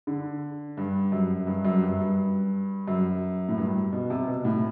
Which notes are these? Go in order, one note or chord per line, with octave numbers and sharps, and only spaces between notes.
D3
G2
F#2
G2
F#2
G2
G2
F#2
A2
G2
B2
C3
B2
A2